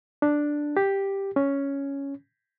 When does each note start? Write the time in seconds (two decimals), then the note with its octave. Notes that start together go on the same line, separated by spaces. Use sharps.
0.22 D4
0.77 G4
1.36 C#4